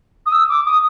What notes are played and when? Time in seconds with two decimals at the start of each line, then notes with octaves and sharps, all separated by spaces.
0.26 D#6
0.32 E6
0.49 D6
0.66 D#6